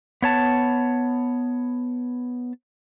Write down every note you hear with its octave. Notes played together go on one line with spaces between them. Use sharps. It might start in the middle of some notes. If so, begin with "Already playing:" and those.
B3 C#5 A5